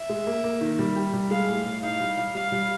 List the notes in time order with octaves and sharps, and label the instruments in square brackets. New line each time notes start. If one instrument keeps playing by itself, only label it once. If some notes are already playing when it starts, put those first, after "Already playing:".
Already playing: [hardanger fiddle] E5
[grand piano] G#3
A#3
A#3
D#3
G3
G4
G3
[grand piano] G#3 [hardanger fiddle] F5
[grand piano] A2
A2
[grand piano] D#4 [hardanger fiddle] F5
[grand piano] G3
G3
[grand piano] G3 [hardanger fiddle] F5
[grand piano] G3